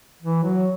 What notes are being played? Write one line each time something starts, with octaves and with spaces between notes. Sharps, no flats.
E3
F#3